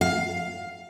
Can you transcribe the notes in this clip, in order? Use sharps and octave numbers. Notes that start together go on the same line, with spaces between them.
F5